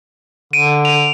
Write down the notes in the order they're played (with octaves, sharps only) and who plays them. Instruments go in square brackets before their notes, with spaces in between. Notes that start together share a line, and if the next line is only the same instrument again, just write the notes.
[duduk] D3 [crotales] D7 D#7
[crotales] D#7 F7